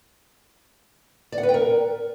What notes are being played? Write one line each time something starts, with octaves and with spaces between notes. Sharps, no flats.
D5
F#5
B4
G5
A#4